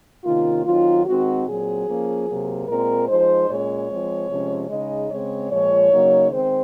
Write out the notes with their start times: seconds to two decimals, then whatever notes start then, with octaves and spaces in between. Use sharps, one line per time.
0.25 C3 D#3 A#3 C#4 F4
0.66 D#3 F#3 C4 D#4 F4
1.06 D#3 G#3 C4 D#4 F#4
1.46 A#2 F#3 C4 G#4
1.87 F3 A#3 C#4
2.28 C3 F#3 A#3
2.68 A#2 G#3 C4 A#4
3.09 F3 G#3 D#4 C5
3.49 A#2 G#3 C#4 C#5
3.90 F3 G#3 C4
4.30 C3 F3 G#3 C#4
4.70 C#3 G#3 D#4 D#5
5.10 C#3 G#3 C4 C#5
5.51 A#2 F3 G#3 C#5
5.91 C#3 F#3 A#3 D#4
6.32 D#3 G#3 C4 C5